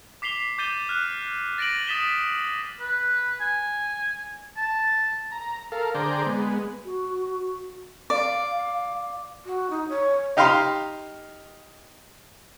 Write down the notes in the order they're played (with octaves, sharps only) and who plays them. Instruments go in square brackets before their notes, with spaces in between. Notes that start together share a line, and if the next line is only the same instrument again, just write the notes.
[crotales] D6 B6 C7 F7 G7
D6 G6 A6 D#7 G7
F6 F#6
A6 A#6 D7 D#7 F#7
D#6 A6 B6 E7 G7
[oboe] B4
G#5
A5
[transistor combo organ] A#5
A4 A#4 F5
D3 G#4 C5 D5 G5 A#5
G#3 B3
[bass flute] F#4
[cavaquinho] D5 [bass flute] F5
[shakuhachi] F#4
D#4
C#5
[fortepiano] D#4 G4 F5 A#5 C6